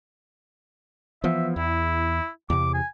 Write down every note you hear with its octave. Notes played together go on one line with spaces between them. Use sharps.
E3 F3 B3 E5
E2 E4
E2 C3 D6
G#5